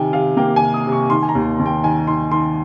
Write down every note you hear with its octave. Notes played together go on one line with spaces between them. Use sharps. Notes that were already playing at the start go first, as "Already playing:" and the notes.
Already playing: C3 D#3 G5 G#5
C3 F5
A#3 G5
G#5
C3
D#6
C3
C#6
D#3 C6
G#5
A#5
D#2
D#2
G5
D#3 G#5
D#3 C6
D#3 C6